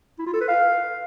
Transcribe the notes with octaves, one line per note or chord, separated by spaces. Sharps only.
E4
F4
A4
B4
F5